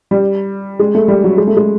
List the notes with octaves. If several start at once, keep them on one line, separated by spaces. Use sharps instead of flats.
G3
G#3
A3
G3
F#3
G#3
A3
G#3